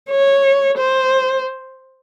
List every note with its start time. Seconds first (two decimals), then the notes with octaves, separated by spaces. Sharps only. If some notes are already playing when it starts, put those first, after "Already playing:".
0.10 C#5
0.78 C5